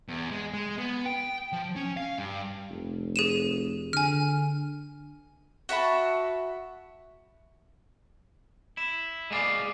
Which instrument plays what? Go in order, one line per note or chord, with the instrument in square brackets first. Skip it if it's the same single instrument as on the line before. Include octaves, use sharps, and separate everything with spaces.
[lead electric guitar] E2
G#3
G#3
B3
G5
F3
C#4
F5
G2
[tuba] F1
[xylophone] G#4 D#7 E7
[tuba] D3 [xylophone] G#5 F6
[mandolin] F#4 E5 A5 B5
[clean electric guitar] E4
G#3 B3 G#4 D5 F5